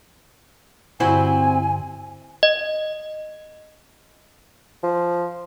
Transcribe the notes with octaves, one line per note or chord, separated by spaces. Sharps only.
G2 D3 C4 E4 F#4 G#5
D#5
F3